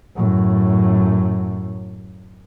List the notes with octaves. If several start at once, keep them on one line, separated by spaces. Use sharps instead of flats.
F#2 A2